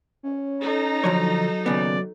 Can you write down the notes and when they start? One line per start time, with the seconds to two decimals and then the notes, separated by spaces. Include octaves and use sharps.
0.23 C#4
0.62 D#4 A4 A#5
1.04 D3 F3 F#3 C#5
1.66 D#2 C#3 B3 D5